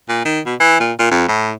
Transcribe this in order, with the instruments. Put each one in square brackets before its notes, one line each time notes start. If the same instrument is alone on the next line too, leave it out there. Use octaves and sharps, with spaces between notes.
[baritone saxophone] A#2
D#3
B2
E3
A#2
A#2
F2
A2